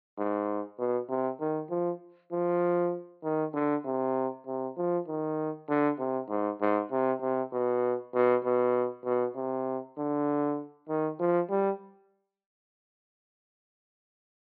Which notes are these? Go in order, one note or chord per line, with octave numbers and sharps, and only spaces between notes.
G#2
B2
C3
D#3
F3
F3
D#3
D3
C3
C3
F3
D#3
D3
C3
G#2
G#2
C3
C3
B2
B2
B2
B2
C3
D3
D#3
F3
G3